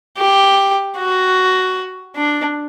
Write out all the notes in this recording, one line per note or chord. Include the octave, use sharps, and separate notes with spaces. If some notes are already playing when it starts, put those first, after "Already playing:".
G4
F#4
D4